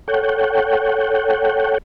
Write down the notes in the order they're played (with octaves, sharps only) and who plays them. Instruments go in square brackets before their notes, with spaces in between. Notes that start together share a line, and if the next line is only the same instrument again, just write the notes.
[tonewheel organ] A4 C#5 F#5 G5